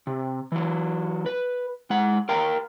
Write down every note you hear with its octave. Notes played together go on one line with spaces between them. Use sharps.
C3
E3 F#3
B4
G#3 F#5
A#4 F5 G5 A#5